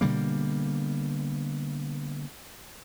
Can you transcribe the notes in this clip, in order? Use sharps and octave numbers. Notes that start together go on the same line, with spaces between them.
B2 D3 G3 A#3